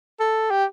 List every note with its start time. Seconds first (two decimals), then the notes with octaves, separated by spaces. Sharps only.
0.20 A4
0.51 G4